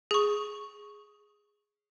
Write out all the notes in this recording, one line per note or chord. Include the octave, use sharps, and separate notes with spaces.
G#4 C#6